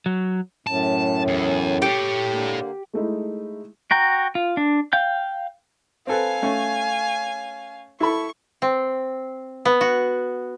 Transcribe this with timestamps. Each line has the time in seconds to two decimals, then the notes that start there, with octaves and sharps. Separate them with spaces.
0.06 F#3
0.67 F#2 A2 A5
1.28 E2
1.82 G4 A4 C#5
2.31 D3 A#3
2.94 G#3 A3 D#4 E4
3.91 F#4 G5 A#5
4.35 F4
4.57 D4
4.93 F5 G5 G6
6.07 C4 A4 B4 F5 G#5
6.42 A3 C#4 C#5
8.00 E4 A4 B5 C#6
8.62 C4
9.65 B3
9.81 F#4